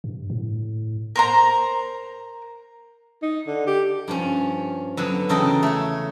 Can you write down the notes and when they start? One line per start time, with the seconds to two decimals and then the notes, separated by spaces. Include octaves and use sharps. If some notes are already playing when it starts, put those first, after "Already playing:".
0.04 G2
0.30 A2
1.16 A#4 C5 A#5
3.22 D#4
3.47 D3
3.67 G4
4.08 G2 F3 C#4
4.97 D3 F#3 B3 D4
5.29 E2 C#3 A4 A#4 D#5 G5
5.63 A3 C#5